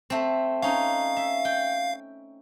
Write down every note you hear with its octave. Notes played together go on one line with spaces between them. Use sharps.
A3 C4
C#4 D#4 F5
E5
G5